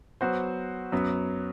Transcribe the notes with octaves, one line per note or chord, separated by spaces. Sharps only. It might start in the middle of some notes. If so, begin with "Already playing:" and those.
F#3 B3 F#4 C5
F#2 F#3 B3